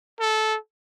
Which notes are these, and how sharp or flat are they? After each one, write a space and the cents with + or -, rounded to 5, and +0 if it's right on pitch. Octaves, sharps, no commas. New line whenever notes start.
A4 -15